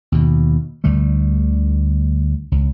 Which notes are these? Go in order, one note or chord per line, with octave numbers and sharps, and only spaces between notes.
D#2 B2
D2 D3 G3 A3
C#2